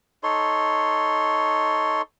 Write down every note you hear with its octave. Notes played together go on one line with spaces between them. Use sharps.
D#4 A4 C#5 C6